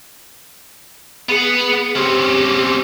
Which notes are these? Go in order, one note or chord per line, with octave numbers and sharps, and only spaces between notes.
B3 G#4 F#5
C4 C#4 G4